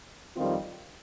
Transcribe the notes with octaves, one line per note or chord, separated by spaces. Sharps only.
F2 D#3 G3 C4 F4